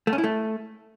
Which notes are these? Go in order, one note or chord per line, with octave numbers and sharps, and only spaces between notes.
A3
C#4
E4
A3